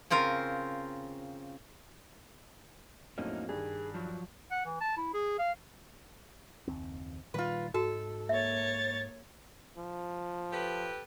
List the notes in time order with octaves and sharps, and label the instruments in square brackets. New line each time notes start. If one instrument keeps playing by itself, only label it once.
[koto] C#3 C4 F4 A#4
[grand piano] F2 A2 F#3 [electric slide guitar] A#3 C#4 D#4
[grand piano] G2 D#3 [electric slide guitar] G#4
[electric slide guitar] F3 F#3
[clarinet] F#5
E3
A5
E4
G#4
F5
[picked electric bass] F#1 D#2 C4
[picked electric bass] A#2 D#3 G3 [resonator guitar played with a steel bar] F4 B4
[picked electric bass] G#2 [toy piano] F#4 [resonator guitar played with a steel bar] A4
[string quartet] A#3 C#5 A6 [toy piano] E5
[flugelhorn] F3
[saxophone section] G4 A4 B4